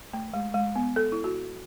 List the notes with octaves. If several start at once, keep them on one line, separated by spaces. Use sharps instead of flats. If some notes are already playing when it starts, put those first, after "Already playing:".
A3
G#3
G#3
B3
A4
E4
F#4